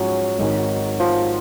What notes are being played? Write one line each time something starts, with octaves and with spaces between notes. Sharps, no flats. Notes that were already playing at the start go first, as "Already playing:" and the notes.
Already playing: G#2 F3 F#3 G#3 C#4
G#1 G#2 D#3
F3